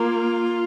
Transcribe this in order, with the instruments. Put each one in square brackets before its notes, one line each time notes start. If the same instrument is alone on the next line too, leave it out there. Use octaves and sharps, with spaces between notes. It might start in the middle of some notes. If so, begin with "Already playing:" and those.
Already playing: [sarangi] A#3 [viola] F4